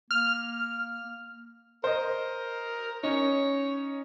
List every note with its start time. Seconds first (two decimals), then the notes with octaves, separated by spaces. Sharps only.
0.11 A#3 F6
1.84 A#4 C5 D#5
3.03 C#4 D#4 C#5